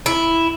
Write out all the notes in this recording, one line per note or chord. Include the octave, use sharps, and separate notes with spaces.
E4